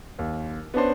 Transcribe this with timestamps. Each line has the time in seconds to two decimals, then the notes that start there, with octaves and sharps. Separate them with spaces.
0.19 D#2
0.74 B3 C#4 D4 C5